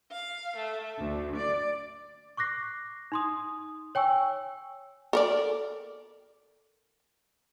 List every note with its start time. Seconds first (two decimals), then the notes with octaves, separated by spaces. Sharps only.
0.11 F5
0.56 A3
0.98 D2
1.37 D5
2.37 C#6 D6 F#6 A#6 C7
3.12 D#4 C6 D#6
3.95 C#5 G5 G#5 C#6 E6
5.13 A4 A#4 D5